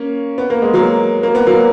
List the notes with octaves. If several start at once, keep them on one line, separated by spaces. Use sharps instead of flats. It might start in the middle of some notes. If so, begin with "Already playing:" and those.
Already playing: A#3 C#4
B3
A#3
G#3
F#3 A#3
A#3
B3
F#3 A#3